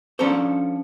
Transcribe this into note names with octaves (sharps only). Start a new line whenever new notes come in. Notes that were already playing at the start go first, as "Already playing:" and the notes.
F3 C#4 D4 A4 A#4 C5